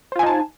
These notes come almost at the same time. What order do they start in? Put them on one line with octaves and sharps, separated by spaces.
C5 F4 G#5 D#4 A5